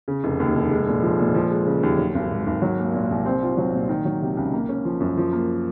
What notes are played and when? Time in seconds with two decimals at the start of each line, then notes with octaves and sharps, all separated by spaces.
0.08 C#3
0.24 F1
0.40 D#2
0.55 F1
0.71 G#3
0.88 A#2
1.02 F3
1.19 A#2
1.35 F3
1.50 G#3
1.66 C#3
1.83 D#2
1.98 F#3
2.15 G#1
2.31 G#2
2.46 G#1
2.62 F#3
2.78 A#3
2.94 A#2
3.10 C2
3.26 C4
3.42 F4
3.57 F#3
3.73 A#2
3.89 D#3
4.05 F#3
4.22 C3
4.37 C#2
4.53 A#3
4.69 C#4
4.85 F3
5.00 F#2
5.17 F3
5.32 A#3